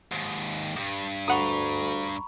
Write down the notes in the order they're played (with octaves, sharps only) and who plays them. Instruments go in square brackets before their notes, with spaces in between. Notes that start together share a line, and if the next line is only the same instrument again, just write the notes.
[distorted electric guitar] D#2 G#2
E2 G2
[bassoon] D2 [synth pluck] F#5 D#6 [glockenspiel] A#5 B5 C#6